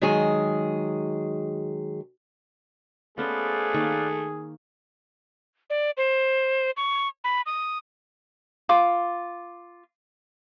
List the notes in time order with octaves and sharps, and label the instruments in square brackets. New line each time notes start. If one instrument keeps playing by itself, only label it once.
[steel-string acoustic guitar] D#3 F#3 G#3 G#4
[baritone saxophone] A3 [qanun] B3 C#4 C5 [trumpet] G#4 [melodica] B4 D5 F5
[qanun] D#3 A#3 C#6
[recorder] D5
C5
C#6
B5
D#6
[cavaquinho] F4 D6